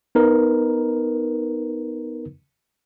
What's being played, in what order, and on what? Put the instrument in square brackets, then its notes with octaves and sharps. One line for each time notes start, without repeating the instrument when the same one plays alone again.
[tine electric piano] B3 D#4 A#4 B4